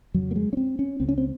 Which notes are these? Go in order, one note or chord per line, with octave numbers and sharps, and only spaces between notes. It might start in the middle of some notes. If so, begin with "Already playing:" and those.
F2 C#3 F#3
A#3
G#3
C#4
C4
C#4
C#2 C#3 C4
C#4
C4